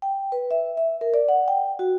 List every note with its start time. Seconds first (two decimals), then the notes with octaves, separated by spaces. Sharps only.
0.02 G5
0.32 B4
0.51 E5
0.77 E5
1.01 A#4
1.14 D5
1.29 F#5
1.48 G5
1.79 F#4